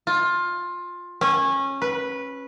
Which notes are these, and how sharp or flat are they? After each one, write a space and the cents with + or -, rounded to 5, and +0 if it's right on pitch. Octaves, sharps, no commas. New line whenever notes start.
F4 +15
C#4 -20
B4 -10